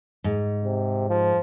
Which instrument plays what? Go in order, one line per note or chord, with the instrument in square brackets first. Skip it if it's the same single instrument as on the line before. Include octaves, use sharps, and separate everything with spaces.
[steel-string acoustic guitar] G#2
[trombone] C3
F3